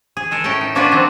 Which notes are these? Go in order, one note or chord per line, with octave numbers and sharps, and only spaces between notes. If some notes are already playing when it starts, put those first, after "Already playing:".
G#4
G#3 A4 A#4
A2 C#4 A#4 G5 A5
D#4
A#3 C#4 D4 F4 F#4 B4
C3 D#3 F3 F#3 C4